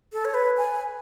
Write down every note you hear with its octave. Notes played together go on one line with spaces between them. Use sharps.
A4
C#5
B4
G#5